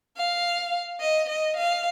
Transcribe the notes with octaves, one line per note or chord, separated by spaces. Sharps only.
F5
D#5
D#5
F5